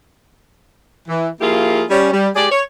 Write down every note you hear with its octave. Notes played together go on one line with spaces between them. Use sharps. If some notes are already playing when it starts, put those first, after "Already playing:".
E3
F3 A#3 E4 F4 G4 G#4
G3 C#4
G3
G#3 G4 G#4 D5
C#5